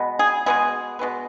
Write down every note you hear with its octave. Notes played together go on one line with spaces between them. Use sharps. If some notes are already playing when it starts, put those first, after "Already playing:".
Already playing: B2 G#3 B3
G#4
B2 G#3 B3 G#4
B2 G#3 B3